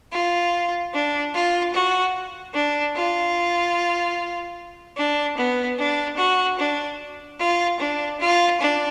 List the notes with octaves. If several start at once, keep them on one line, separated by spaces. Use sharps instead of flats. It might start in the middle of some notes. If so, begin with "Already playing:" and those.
F4
D4
F4
F#4
D4
F4
D4
B3
D4
F#4
D4
F4
D4
F4
D4